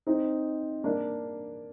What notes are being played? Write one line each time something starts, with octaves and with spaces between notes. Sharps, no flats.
C4 D#4
A#3 D4